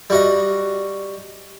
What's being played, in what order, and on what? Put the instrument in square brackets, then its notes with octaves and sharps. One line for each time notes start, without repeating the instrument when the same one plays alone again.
[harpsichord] G3 F#4 D#5